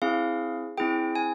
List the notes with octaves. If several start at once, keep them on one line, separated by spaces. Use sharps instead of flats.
C4 E4 G#4 F5
C4 E4 G#4 G5
G#5